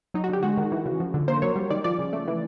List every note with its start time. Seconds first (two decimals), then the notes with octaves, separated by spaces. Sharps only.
0.14 F#3 D#4
0.24 F#4
0.29 D3 G4
0.43 G#3 F#4
0.57 D#3
0.72 E3
0.86 C#3
1.00 F3
1.14 D3
1.28 A#3 C5
1.42 F#3 C#5
1.56 G3
1.70 D#3 D5
1.84 F3 D5
1.99 C#3
2.13 A3
2.28 E3